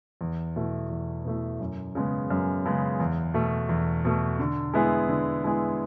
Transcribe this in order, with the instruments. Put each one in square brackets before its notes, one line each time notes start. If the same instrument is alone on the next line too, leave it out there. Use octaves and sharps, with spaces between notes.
[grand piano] E2
B2 A3 E4
E2
B2 A3 E4
F#2
C#3 G#3 B3
F#2
C#3 G#3 B3
E2
B2 A3
E2
B2 A3
D3
G#3 B3 E4 G#4
D3
G#3 B3 E4 G#4